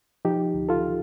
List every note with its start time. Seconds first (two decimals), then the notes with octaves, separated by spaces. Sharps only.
0.25 F3 D#4 G4
0.54 D2
0.69 F4 A4